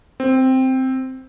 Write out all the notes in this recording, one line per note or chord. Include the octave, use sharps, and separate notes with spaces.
C4